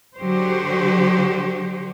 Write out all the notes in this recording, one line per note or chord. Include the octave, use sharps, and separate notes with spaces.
D3 F#3 F#4 G4 C5